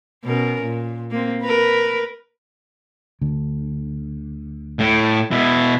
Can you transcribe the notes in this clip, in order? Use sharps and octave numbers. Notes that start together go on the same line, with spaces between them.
B2 C#4 A#4
A#2
A#3 C4
A#4 B4
D2 D3
A2
B2 E4